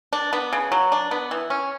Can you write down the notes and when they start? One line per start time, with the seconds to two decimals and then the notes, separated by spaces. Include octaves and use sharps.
0.13 D4
0.33 B3
0.53 C#3
0.72 F#3
0.92 D4
1.11 B3
1.31 E3
1.50 C#4